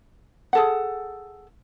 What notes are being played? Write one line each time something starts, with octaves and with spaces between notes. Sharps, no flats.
G#4 A4 F#5